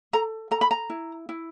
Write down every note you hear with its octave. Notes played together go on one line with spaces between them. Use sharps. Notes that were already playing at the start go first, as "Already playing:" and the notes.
A4 A#5
A4 A#5
B5
A#5
E4
E4